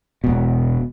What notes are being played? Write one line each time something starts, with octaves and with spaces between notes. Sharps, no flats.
E1 B2